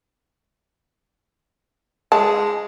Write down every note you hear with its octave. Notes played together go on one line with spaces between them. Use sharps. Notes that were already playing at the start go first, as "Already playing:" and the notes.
G#3 A5